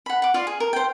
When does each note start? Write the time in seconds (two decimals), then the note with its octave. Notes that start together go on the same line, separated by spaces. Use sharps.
0.06 F#5 B5
0.22 F#5 D6
0.34 F4 D5 F5
0.47 G#4
0.60 A#4
0.73 C5 G5